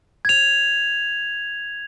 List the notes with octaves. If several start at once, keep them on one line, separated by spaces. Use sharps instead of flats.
G#6 F7